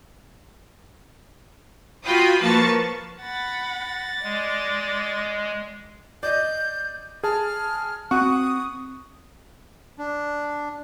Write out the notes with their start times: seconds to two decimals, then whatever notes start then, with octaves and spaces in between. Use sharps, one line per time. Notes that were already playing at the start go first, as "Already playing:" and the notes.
2.04 F4 F#4 F5 G5 B5 D#6
2.40 F3 A#3 B4 A5 C#6 A6
3.22 F#5 B5 A6 A#6
4.23 G#3 D5
6.23 D5 D#5 G6
7.23 G#4 A5 F6
8.11 C4 F#4 F#5 C#6 D#6
9.99 D4